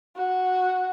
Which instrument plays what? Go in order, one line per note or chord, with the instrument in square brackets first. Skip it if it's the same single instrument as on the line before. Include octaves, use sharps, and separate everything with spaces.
[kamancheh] F#4